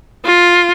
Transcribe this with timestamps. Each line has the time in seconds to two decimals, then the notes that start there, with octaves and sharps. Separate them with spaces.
0.25 F4